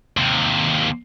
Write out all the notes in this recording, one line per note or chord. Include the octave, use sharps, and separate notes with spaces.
D#2 C3